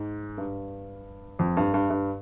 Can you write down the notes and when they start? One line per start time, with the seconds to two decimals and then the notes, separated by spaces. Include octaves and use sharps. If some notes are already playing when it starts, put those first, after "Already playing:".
Already playing: G#2
0.38 G2
1.39 F2
1.57 G2
1.74 G2
1.90 G2